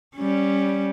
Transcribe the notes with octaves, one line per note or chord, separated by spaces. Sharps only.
G3 C#4